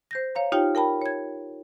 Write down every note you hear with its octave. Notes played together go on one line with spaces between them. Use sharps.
C5 G6 A#6
C#5 F5 A#5
D#4 F4 G4 C#5 G5 F6
A#4 G5 A5 B5
C#5 G#6